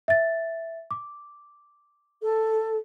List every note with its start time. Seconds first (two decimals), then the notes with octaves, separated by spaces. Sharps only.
0.08 E5 A6
0.91 D6
2.22 A4